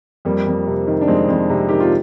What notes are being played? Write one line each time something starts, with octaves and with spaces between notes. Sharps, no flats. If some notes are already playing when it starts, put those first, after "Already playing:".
F2 G3 A#3
F2
C3
D#3
D4
F2 G#3 C4
F2
C3
D#3 G4
F4